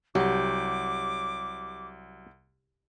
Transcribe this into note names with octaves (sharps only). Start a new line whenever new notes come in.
C2 F#3 G4 D6